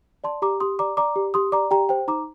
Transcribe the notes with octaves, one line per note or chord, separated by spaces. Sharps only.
D5 A5 C6
G4 A#5 D6
G4 C6 D#6
D5 A#5 D6
D5 A#5 D6
G4
G4 C6 D#6
D5 A#5 D6
G4 G5 A#5
C5 G5
D#4 A#5 D6